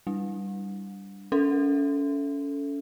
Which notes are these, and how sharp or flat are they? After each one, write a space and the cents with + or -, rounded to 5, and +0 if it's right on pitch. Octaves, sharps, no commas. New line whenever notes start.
G3 +0 D4 +0
C#4 +30 A4 +0 E5 +20